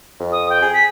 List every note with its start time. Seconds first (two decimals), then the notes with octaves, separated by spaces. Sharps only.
0.20 F2
0.32 D#6
0.50 G5
0.62 G#4
0.74 B6